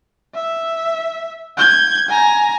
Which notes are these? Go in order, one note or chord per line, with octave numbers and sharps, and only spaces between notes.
E5
G6 G#6
G#5 A#5